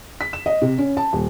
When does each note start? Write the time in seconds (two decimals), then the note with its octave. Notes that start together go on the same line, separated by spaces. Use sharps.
0.21 B6
0.33 E7
0.46 D#5
0.62 C3
0.78 C#4
0.97 A5
1.13 D#1